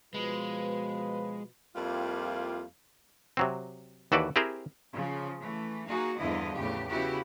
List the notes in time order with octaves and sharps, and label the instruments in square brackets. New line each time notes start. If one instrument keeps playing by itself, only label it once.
[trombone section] B2 F3 [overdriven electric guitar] G#3 [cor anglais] B4
[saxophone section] F2 G3 A#3 E4 F4 F5
[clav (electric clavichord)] C3 F#3 C4
D#2 E3 F#4 A4 B4 D5
C4 E4 G4 G#4 A#4 C5
[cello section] C#3 F3
E3 A3
A#3 D#4 F#4 G#4
E2 G2 D3 F3 E4 D#5
E2 A2 C#3 G4
C#3 B3 E4 F#4 G4